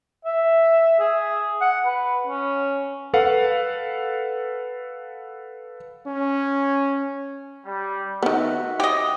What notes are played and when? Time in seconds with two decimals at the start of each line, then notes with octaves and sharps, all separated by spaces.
0.25 E5
1.00 G#4
1.61 F#5
1.86 B4
2.27 C#4
3.14 A4 B4 F5 F#5
6.07 C#4
7.66 G3
8.23 D#3 B3 F#4 E5
8.80 G4 D#5